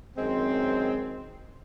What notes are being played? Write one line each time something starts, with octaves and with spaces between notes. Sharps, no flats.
F#2 D#3 G#3 C4